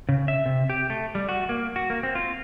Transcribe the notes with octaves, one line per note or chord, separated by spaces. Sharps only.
C#3
E5
C3
G4
A3
G3
F#4
A#3
F#4
A#3
C4
F4